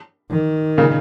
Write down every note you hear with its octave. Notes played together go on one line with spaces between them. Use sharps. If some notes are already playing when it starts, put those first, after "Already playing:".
D#3
A#2 C#3